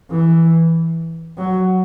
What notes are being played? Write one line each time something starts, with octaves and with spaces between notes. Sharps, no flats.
E3
F#3